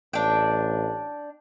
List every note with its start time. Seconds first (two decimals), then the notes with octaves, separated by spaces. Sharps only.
0.13 A1 D4 G5